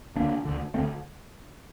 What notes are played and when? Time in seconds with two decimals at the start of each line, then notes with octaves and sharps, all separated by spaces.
0.16 D2 D3 A#3 D4
0.45 D2 D3
0.74 D2 D3 A3 C4